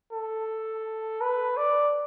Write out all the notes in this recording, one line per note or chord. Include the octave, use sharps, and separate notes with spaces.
A4
B4
D5